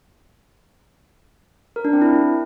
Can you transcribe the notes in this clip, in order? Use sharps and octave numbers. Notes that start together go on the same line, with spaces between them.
A#4
D4
C4
E4